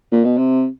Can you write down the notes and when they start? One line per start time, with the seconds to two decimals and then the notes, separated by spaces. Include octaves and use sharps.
0.11 A#2
0.24 B2
0.38 C3